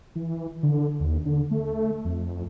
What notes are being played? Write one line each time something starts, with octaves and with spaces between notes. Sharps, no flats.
E3
D3
D#2
D3
A3
F2